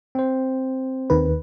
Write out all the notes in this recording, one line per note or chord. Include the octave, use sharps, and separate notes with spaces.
C4 C5
D#2 D#3 B4